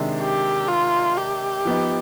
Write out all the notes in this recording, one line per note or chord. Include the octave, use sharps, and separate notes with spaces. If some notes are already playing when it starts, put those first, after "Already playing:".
Already playing: C3 D#3 G#3 D4
G4
F4
G4
F3 B3 D#4